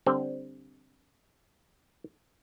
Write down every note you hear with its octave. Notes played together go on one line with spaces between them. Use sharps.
D3 G3 C4